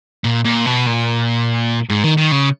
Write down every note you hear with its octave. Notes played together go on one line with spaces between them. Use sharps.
A#2
A#2
B2
A#2
G#2
D#3
D#3
C#3